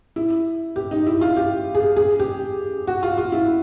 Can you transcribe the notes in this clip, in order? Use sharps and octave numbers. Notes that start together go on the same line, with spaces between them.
E4
G4
D#4
E4
F4
G4
G#4
G#4
G4
F#4
F4
F4
E4